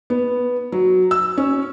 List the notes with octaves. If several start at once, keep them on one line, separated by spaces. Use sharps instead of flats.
B3
F#3
E6
C#4